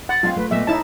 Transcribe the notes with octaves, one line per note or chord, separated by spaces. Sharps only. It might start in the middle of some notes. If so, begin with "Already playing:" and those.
F#5 A6
G#3 C4 F4 F5
A3 B4
A#2 A3 B3 D#5 E5
D#4 E4 C#5 A5